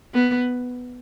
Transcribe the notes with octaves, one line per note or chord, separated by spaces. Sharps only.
B3